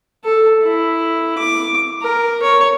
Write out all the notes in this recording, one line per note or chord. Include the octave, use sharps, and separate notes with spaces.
A4
E4
D6
A#4
C#5